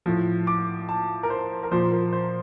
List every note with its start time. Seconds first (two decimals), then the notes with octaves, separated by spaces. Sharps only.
0.06 A2 F3
0.47 D6
0.89 A5
1.23 A#4
1.30 C5
1.63 A#4
1.71 A#2 F3 C5
1.92 A#4
2.13 C5